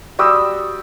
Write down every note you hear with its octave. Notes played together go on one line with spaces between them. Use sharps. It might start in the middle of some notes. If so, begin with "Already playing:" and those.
G3 F#4 D#6 E6